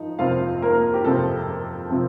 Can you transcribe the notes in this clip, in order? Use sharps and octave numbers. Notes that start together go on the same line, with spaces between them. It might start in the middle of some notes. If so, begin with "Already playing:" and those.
Already playing: F3 D#4
F2 C3 F3 C4 F4 F5
A#3 A#4
G4
F2 C3 F3 C4 A4
C3 F3 C4